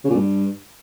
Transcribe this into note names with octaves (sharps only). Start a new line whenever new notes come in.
C#3
A#2
G2